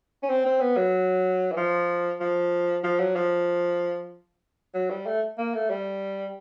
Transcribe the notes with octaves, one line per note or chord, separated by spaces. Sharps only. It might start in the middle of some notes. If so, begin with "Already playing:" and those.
C#4
C4
C4
B3
F#3
E3
F3
F3
F3
F#3
F3
F#3
G3
A3
A#3
A3
G3